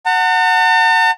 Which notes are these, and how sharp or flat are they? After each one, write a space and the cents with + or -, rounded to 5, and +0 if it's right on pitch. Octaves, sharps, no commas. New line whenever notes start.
F#5 +0 A5 +45